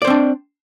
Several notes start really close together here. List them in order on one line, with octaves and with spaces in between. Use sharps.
D5 C5 C4 D4